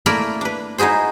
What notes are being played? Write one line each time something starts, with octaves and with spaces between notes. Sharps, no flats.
A3 A#3 E4 A#4 D5 E5
D4 B4
D#4 E4 F#4 G#4 C5